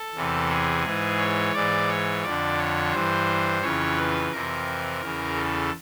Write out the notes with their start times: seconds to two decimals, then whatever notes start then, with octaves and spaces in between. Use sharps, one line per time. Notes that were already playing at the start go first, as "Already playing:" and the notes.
Already playing: A4
0.15 E2 C3 E3
0.50 G#4
0.84 G#2 E3
1.18 C#5
1.53 G#2 E3 D5
1.89 C#5
2.23 F2 D5
2.28 D3
2.58 C#5
2.92 G2 E3 C5
3.62 F2 C#3 E3 C#5
3.97 B4
4.31 F2 C3 E3 A#4
5.01 E2 C#3 E3
5.36 A4